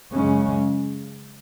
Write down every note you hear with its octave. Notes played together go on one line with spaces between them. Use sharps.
F#2 C#3 G#3 C#4